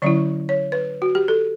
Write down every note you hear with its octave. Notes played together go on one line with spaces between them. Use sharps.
D3 F#3 C#4 E4 D5
C#5
B4
F#4
G4
A4